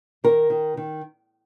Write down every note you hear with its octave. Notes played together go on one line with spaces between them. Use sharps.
D#3 A#4
D#3
D#3